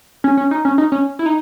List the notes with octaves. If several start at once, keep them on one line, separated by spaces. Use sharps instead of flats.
C#4
C#4
D#4
C#4
D#4
C#4
E4
D#4